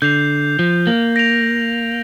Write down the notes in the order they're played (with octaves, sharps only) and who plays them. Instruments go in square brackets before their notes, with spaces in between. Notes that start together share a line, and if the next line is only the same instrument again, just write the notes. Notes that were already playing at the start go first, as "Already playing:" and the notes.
[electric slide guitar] D3 [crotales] G6 C7 F7
[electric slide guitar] F3
A#3
[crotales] A#6 D7 F7